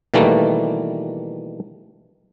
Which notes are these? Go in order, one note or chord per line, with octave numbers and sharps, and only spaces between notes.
B2 D#3 E3 G3 A3 A#3